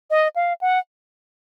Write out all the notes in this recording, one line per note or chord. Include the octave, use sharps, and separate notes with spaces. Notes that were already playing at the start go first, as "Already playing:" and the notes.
D#5
F5
F#5